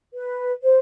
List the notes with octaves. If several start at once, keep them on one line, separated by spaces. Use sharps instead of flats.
B4
C5